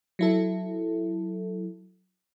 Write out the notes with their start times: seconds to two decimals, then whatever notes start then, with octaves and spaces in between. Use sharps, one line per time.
0.19 F#3 E4 A4